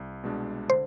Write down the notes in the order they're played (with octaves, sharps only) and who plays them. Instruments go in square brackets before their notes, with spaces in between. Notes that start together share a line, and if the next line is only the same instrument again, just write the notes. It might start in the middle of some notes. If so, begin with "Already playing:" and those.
Already playing: [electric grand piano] C2
B2 G#3 D4
[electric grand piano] D3 [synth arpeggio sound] C5